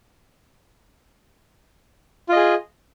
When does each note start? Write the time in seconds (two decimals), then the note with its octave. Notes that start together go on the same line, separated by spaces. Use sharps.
2.29 F4
2.33 D#5
2.36 G#4